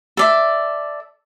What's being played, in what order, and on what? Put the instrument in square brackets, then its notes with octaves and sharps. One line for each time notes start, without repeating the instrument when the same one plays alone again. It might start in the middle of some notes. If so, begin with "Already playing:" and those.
[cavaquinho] A4 D5 E5